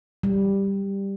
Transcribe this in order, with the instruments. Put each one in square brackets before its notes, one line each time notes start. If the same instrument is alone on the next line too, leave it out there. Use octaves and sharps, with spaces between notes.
[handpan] G3